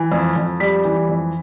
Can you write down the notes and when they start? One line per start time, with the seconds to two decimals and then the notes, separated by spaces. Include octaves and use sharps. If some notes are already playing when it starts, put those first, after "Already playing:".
Already playing: E3
0.12 F2
0.36 F2
0.60 G3 B6
0.85 E3
1.09 F2